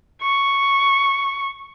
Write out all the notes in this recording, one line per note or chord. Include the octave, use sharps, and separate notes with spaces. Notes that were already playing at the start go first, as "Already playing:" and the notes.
C#6